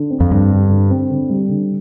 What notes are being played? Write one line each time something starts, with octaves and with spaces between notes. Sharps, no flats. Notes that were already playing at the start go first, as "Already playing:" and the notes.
Already playing: D3
C4
F2
G2 D3
G3
D3
C4
D3
G3
D3